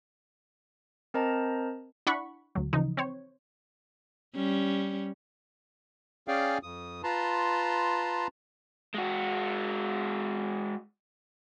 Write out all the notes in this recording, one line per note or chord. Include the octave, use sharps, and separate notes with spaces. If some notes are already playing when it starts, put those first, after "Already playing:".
C4 A#4 C5 D#5 A5 A#5
D4 E4 F#5 B5 C#6
D2 F#3
C#3 E3 F3 D#4
C4 C5 C#5
G3 C#4
C#4 G#4 D5 F5 G5
F2 D#6
F4 B4 A5 A#5 C6
G#3 F#4